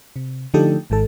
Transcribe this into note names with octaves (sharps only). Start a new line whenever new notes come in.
C3
D3 F3 A3 D#4 G4 A4
G#1 G#2 D#3 A4